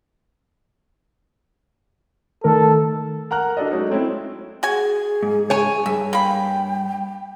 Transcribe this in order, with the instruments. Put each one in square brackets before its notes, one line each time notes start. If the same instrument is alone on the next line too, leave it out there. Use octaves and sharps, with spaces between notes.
[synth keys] D#3 A3 A#4 [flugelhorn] A4
[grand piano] A#4 F#5 A#5 F6 F#6
D4 F#4 A4 D5 D#5
F#3 G#3 A3 C#4 D#4
A3 C4 C#4 E4
[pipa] F#4 G#5 [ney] G#4
[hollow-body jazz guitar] G#2
[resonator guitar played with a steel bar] C#5 G#5
[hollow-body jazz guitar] G2 [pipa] E5
[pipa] A#3 B5 [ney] G5